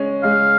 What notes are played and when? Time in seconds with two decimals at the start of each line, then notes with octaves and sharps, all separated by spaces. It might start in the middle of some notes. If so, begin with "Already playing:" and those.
Already playing: G#3 C#4
0.23 G#3 F5